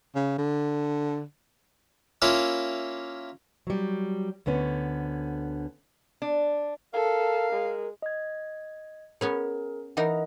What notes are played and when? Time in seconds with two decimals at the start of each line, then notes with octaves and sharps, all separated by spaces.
0.15 C#3
0.38 D3
2.22 A#3 C#4 E4 F4 C#5
3.67 F#3 G3
4.46 D2 D3 B3 C#4
6.22 D4
6.94 A4 A#4 F5
7.53 G#3
8.02 D#5 G#6
9.21 B3 C#4 G#4 A#4 C#5
9.97 E3 D#4 A#4 D#5 F#5